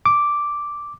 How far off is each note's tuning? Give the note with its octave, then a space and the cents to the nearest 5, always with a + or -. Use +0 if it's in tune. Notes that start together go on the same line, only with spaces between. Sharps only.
D6 +0